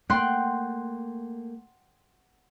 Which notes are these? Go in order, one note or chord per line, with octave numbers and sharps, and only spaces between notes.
A3 A#3 F#5 G5 C6